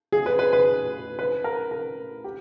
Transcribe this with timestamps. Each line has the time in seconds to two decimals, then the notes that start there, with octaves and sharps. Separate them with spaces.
0.12 G#4
0.26 B4
0.39 B4
0.53 B4
1.19 B4
1.44 A#4
1.71 A#4
2.24 G4